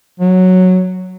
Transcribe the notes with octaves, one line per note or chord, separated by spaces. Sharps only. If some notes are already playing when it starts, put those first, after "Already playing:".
F#3